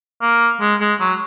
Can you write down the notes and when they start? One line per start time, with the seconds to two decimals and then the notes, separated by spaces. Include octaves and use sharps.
0.22 A#3
0.61 G#3
0.81 G#3
1.00 F#3